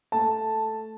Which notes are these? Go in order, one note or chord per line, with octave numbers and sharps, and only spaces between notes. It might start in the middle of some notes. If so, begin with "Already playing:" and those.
A3 A5